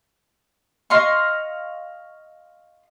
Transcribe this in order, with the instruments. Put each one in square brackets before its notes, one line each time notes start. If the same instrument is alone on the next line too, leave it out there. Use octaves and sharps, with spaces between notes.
[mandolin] D#5 F5 C6 C#6